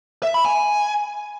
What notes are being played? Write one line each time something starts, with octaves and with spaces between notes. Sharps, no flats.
E5
B5
G#5